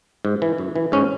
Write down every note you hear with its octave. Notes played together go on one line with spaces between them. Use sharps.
G#2
E3
F#2
E3
G#2 C#4